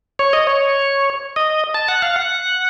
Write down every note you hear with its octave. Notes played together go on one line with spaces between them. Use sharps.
C#5
D#5
C#5
D#5
A5
F#5
F5
F#5